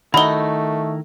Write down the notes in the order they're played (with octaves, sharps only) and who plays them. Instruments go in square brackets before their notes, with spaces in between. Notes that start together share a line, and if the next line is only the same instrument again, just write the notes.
[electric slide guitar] D#3 E4 A#4 [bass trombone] A3 [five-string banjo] D#4 F#4 [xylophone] B5 G7